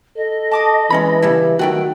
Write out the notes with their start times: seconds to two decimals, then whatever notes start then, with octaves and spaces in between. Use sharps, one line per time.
0.16 A4 D#5
0.51 A5 D6 D#6
0.90 E3 G#3 C#4 B5
1.22 C#3 G3 E4
1.59 D#3 F#3 A3 F#4 G5